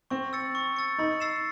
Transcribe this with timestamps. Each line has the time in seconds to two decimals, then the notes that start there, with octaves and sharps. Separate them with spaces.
0.10 C4 C#6
0.33 E6 A6 C#7
0.55 C#6
0.76 E6 A6 C#7
0.98 D#4 B5
1.20 E6 A6 C7 E7